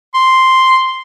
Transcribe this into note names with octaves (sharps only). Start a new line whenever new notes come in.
C6